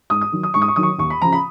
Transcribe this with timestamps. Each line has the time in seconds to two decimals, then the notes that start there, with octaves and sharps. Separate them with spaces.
0.10 G#2 D#6
0.21 D#6
0.32 D#3 F#3
0.43 D#6
0.54 G#2 C#6
0.62 D#6
0.68 C#6
0.76 D#3 F#3 D#6
0.83 C#6
0.98 D#2 C#6
1.10 B5
1.22 C#3 F3 A#5
1.32 B5